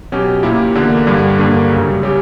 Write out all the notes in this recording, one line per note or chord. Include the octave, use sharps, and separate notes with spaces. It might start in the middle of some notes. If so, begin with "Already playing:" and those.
B2 F#3 C#4 G4
A#2 A#3 E4 G4
E2 D3 A#3
G2 D3 G3
G2 D3 A#3
F#2 C#3 G3
C#3 G3 C#4 G4